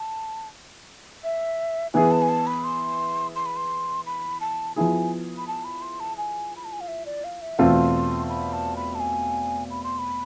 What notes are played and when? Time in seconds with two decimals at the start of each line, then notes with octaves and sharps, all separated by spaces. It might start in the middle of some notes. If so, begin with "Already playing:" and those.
Already playing: A5
1.24 E5
1.94 E3 B3 E4 G#4 G#5
2.11 A5
2.22 G#5
2.29 A5
2.47 B5
2.64 C6
3.35 C6
3.46 B5
3.56 C6
4.06 B5
4.41 A5
4.76 F3 B3 E4 G#4 G#5
5.37 B5
5.48 A5
5.64 B5
5.82 C6
6.00 A5
6.17 G#5
6.56 B5
6.65 A5
6.73 G#5
6.81 F5
6.88 E5
7.06 D5
7.24 F5
7.42 E5
7.59 E2 B2 A3 C4 F4 C6
8.30 B5
8.53 A5
8.76 B5
8.95 A5
9.00 G#5
9.70 B5
9.84 C6
9.99 B5